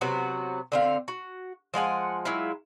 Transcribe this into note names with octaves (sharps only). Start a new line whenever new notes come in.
C3 F#3 B3 F#4
D3 C4 F5
F#4
F3 G#3 F#5 G#5
F#3 G#3 E4 F4